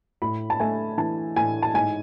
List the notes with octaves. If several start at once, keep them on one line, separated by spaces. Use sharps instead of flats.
A2 B5
A5
A3 G#5
E3 A5
A2 G#5
A5
G#2 G#5